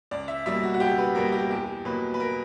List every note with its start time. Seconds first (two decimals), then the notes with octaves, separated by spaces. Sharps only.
0.11 C#2 D5
0.28 E5
0.46 B2 G3 A#3 E5
0.63 F#4
0.74 F#4
0.80 C#2 G4
0.98 B4
1.15 B2 G3 A#3 A#4
1.32 G4
1.51 E2 G4
1.85 B2 F#3 A#3 B4
2.14 B4
2.20 A#4